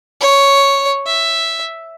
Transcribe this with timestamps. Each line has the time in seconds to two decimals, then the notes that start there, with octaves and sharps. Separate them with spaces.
0.21 C#5
1.06 E5